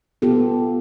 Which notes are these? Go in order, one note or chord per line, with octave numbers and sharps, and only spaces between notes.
B3 F4 G4 A4